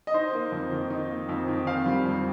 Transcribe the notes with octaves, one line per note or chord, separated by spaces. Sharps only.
D#5
D#4 C5
A#3
F2
D#3
D#4
A#3
F2
D#3
C4 F5
G3
F2